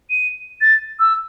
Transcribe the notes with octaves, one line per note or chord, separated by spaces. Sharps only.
D#7
A6
E6